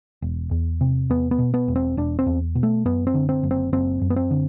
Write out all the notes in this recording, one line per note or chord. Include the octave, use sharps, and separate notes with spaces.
E1
E2
C3
E2 B3
B3
B2
B3
E1
C4
E1 D4
C4
E2
B2
A3
F#2 B3
C4
D3
C4
F#1
C4
F#1 C4
F#2
B3
C4
D3